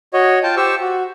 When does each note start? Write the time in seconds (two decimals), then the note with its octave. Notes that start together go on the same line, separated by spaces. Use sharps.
0.13 F#4 C#5 D#5
0.43 F4 G5 A5
0.57 G4 C5 C#6 E6
0.81 F#4